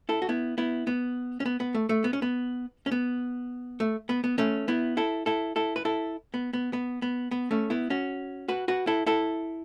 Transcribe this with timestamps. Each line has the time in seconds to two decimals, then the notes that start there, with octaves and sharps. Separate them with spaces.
0.09 E4 A4
0.22 F#4
0.29 B3 E4
0.58 B3 E4
0.87 B3
1.40 C#4
1.46 B3
1.60 B3
1.75 A3
1.89 A3
2.04 B3
2.13 C#4
2.22 B3
2.86 C#4
2.92 B3
3.80 A3
4.09 B3
4.24 B3
4.38 A3 C#4
4.68 B3 E4
4.97 E4 A4
5.26 E4 A4
5.56 E4 A4
5.76 B4
5.85 E4 A4
6.34 B3
6.53 B3
6.73 B3
7.02 B3
7.31 B3
7.51 A3 C#4
7.70 B3 E4
7.90 C#4 F#4
8.48 F#4 B4
8.68 F#4 B4
8.87 E4 A4
9.06 E4 A4